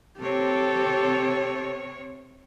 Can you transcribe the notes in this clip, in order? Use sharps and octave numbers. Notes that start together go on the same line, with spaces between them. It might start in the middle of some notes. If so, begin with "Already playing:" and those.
C3 C4 G4 A4 C#5